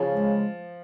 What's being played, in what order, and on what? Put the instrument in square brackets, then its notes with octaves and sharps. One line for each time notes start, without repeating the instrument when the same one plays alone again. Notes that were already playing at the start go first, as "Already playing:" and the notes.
Already playing: [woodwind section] C#3 [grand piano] F3
[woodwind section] G#3